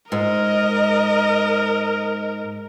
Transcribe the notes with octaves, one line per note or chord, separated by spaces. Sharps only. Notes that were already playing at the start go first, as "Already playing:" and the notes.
G#2 A#4 D#5